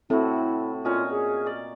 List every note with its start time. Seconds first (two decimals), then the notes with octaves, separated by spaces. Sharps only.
0.10 A2 C4 E4 F#4 A4
0.85 A#2 C#4 F4 D#5
1.11 G#4
1.46 D5